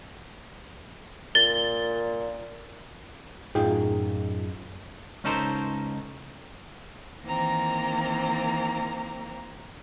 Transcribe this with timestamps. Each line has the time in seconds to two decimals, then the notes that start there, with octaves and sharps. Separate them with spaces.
1.35 A#2 A6 G7
3.55 F#2 A2 D#4 F4 G#4 G5
5.24 C#2 C#4 D#4 A4 A#4 C5
7.23 D#3 E3 A#3 C4 A#5